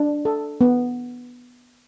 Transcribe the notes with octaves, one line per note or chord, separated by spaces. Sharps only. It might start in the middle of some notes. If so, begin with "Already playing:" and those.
Already playing: D4
A4
B3